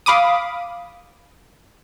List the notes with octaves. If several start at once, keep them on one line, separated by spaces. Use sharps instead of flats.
F5 B5 D6 D#6